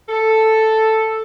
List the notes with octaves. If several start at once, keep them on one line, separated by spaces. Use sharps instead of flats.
A4